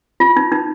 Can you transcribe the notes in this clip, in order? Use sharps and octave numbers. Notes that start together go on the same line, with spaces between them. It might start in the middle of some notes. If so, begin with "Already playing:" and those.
F4
D#4
D#4